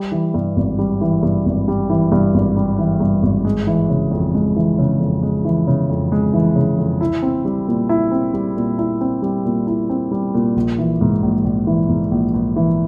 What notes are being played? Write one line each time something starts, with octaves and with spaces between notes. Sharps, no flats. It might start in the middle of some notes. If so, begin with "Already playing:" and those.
Already playing: G3
E3
G2
G#1
G3
E3
G2
G#1
G3
E3
G2
G#1
G3
E3
G2
G#1
G#3
E3
C#3
F2
G#3
E3
C#3
F2
G#3
E3
C#3
F2
G#3
E3
C#3
F2
E4
C4
G3
A#2
E4
C4
G3
A#2
E4
C4
G3
A#2
E4
C4
G3
A#2
A#1
E3
G#2
A#1
A#1
E3
G#2
A#1
A#1
E3